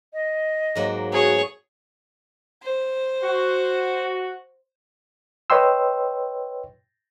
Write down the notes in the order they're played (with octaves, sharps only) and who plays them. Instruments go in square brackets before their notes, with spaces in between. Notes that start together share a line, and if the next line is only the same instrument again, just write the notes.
[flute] D#5
[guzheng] G#2 F#3 A#3
[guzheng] B3 [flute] F#4 [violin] G#4 C#5
[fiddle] C5
[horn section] F#4
[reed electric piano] B4 C#5 D#5 G5 C6 E6